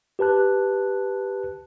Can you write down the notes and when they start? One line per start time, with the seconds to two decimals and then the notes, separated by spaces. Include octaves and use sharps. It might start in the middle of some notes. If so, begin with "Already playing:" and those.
0.19 G4 B4 A5 F#6